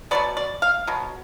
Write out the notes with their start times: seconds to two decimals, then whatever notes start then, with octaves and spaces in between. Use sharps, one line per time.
0.11 B2 F#3 B3 D5
0.37 D5
0.62 F5
0.87 B2 F#3